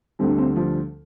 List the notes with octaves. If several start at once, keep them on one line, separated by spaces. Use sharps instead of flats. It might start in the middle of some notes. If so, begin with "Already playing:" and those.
D2 D3 G3 C4
D4
C4
F3 F4